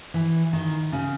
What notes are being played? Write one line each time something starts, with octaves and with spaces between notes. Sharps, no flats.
E3
D#3
C#3